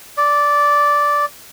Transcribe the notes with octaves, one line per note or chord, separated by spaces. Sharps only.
D5